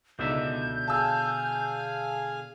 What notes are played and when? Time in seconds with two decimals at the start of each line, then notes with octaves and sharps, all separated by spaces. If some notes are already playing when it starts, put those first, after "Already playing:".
0.19 C#2 B2 D3 D#4 E5 G6
0.88 G#4 F5 G#5 A5 E6